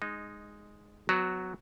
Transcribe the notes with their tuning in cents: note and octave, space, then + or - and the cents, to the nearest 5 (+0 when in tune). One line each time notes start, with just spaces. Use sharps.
G#3 +0 D#4 -10
F#3 +0 B3 +35 F#4 +0